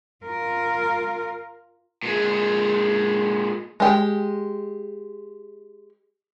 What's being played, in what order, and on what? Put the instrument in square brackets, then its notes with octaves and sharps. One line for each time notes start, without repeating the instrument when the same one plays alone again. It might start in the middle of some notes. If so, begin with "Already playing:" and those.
[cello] F4 A#4
[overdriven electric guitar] A#2 G#3
[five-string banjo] G#3 G4